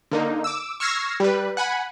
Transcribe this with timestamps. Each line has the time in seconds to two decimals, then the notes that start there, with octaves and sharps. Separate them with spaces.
0.11 D3 A#3 D#4
0.44 D6 E6
0.80 C#6 E6 F6 G#6 A#6 C7
1.20 G3 B4
1.57 F#5 G#5 B5